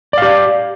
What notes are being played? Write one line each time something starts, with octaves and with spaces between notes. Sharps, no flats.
G4 D5 F5